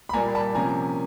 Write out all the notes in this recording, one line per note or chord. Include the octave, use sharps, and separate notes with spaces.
B5
A#2 G3 A#3 G#5 A#5
A5 B5
C3 F3 A#3 C#4 G#5 A#5